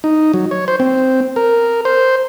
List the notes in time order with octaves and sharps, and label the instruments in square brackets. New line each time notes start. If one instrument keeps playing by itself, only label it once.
[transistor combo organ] D#4
F#3
C#5
C5
C4
A#4
C5